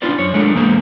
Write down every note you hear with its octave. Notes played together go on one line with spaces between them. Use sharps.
C#4 D4 F4 B4 C5 D5
F#2 C#5
G#3 A3 D4 D#4 A4 A#4
E2 G#3 A#3 C5